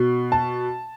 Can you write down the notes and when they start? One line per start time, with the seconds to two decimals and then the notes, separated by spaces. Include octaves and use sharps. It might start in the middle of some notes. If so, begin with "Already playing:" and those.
Already playing: B2
0.32 A5